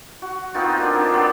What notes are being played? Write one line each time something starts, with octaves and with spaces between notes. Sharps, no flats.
F#4
B3 C4 D#4 F4
A#3 D4
F3 C4
F#3 B3 D4